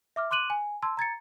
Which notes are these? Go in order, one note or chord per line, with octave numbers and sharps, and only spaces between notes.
E5 D6 F6
C6 D6 F#6 D#7 F#7
G#5
A5 C6 E6 G#6
A#5 G#6 A6 C#7